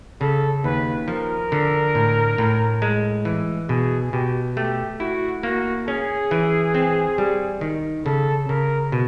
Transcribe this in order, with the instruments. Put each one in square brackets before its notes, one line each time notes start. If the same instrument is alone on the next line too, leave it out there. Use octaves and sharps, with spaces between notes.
[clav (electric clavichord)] C#3 [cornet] A4
[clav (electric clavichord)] D#2 [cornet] B4
[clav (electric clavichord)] F3 [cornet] A#4
[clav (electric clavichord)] D3
A2
A2
G#3
E3
[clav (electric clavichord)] B2 [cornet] G#4
[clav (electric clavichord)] B2 [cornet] G4
[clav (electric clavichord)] A3 [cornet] G4
[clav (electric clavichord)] E4 [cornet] F#4
[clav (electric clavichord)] A#3 [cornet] F#4
[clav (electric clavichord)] C#4 [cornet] G#4
[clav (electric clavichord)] E3
C4
G3
D#3
[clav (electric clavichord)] C#3 [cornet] A4
[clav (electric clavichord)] C#3 [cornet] A#4
[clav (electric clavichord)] B2